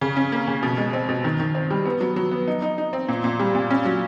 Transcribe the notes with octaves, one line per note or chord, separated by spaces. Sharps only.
C#3
C#4
A#3
C#3
B2
G#3
C4
B2
D#3
D#3
C4
G3
B3
F#3
F#3
B3
D#4
D#4
D#4
C4
A#2
A#2
G3
A#2
C#4
F#3